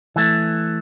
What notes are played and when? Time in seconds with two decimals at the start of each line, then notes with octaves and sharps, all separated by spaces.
0.16 E3 A3